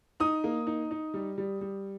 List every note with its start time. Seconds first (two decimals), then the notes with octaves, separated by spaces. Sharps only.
0.20 D#4 D#6
0.44 A#3
0.67 D#4
0.91 D#4
1.14 G3
1.38 G3
1.61 G3